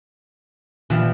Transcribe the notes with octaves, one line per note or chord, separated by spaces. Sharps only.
A#2 E3 F3 G3